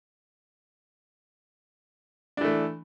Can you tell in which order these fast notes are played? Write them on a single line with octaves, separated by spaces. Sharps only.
D4 E3 A3